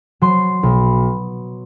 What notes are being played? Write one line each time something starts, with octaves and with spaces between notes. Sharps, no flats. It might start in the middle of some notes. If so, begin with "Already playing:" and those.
F#3 C6
B1